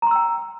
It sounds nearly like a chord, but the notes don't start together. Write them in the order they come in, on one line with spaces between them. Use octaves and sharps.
A#5 C6 E6 G5